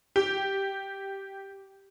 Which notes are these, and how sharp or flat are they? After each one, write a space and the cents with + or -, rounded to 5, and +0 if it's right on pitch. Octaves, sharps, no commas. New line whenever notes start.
G4 -5